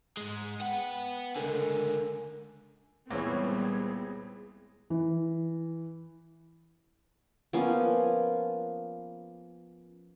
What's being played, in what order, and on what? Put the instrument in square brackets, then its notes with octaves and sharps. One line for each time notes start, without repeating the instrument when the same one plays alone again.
[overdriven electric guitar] G#2 G#3
[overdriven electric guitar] B3 F#5 [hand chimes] G5
[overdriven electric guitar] C#2 D3 [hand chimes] A4 A#4 G#5
[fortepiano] C#2 E3 C#5 [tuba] A#2 [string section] G3 B3 C4 [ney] G#4
[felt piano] E3
[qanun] F3 A#3 B3 C#4